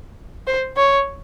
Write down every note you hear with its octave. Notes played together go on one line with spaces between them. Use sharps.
C5
C#5